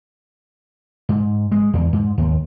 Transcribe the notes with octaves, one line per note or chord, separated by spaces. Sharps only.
G#2
G#3
E2
G#2
D#2